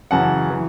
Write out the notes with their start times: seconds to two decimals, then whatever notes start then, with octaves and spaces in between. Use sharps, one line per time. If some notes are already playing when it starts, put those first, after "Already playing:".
0.11 F#2 C#3 E3 F#5 A5
0.50 E3